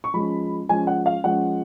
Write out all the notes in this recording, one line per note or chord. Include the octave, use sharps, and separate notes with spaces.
C#6
F3 G#3 C#4 B5
F3 G#3 C#4 G#5
F#5
F5
F3 G#3 C#4 F#5